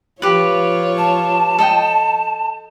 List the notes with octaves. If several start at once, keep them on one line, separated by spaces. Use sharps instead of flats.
F3 F4 G4 B4 C#5
A5
A4 D#5 G5